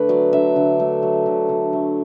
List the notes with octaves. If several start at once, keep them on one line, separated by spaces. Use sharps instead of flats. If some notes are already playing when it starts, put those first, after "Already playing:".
Already playing: D3 A3 B4
F#3 D5
D3 E5
D3
A3
F#3
D3
D3
A3